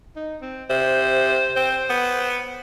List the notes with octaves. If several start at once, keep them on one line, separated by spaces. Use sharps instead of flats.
D#4
C4
C3 C5
C4 C5
B3